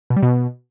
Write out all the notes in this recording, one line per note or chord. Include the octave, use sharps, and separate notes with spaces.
B2
G3
B2